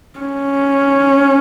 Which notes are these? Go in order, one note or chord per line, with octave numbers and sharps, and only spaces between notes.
C#4